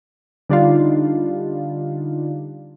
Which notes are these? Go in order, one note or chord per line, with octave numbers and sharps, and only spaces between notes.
D3 G3 D4 D#4 F4